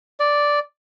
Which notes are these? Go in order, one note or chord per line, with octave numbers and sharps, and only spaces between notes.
D5